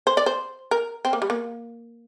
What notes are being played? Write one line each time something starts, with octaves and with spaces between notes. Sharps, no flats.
C5
D5
C5
A#4
C4
A#3
G3
A#3